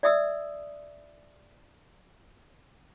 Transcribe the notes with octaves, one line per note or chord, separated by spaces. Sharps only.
D5 E5 D#6 E6